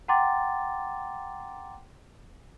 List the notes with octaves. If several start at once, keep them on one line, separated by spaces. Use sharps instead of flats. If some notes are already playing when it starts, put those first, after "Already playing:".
F#5 G5 A#5 C6 D6 A6